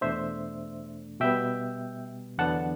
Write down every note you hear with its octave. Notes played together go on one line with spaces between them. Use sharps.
E2 B2 A3 D4 C5 E5
B2 G3 B3 E5 G5
E2 D3 F#3 B3 D4 F#5 A5